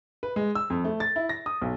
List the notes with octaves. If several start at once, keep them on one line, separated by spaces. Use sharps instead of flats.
B4
G#3
E6
F2
A3
A6
E4
A#6
D#6
B1